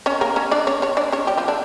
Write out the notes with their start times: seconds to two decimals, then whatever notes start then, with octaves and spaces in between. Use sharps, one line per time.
0.06 C#4 C#5
0.21 A#3 A#4
0.36 C#4 C#5
0.51 D4 D5
0.67 C#4 C#5
0.82 C#4 C#5
0.97 D4 D5
1.12 C#4 C#5
1.27 G3 G4
1.37 F3 F4
1.48 D3 D4